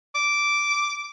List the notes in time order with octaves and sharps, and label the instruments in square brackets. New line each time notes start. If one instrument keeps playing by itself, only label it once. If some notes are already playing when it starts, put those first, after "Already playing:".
[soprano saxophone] D6